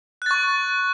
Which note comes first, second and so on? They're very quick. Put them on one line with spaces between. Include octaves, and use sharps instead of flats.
F#6 A6 C#6